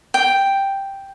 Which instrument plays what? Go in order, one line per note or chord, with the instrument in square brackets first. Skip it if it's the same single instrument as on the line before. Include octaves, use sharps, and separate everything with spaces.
[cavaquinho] G5